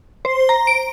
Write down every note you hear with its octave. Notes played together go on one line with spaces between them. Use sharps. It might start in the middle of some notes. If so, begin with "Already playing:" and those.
C5
A#5
D7